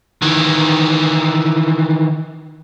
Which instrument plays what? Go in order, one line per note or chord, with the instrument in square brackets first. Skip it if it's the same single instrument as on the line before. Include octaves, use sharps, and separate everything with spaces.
[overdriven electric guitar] D#3 E3